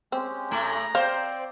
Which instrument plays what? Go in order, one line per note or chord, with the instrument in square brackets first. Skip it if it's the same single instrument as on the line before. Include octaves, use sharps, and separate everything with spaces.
[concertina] G#3 C#4 G4 [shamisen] C4
[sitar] A2 A3 [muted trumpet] A#5
[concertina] C4 D5 [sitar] C5 [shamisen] F5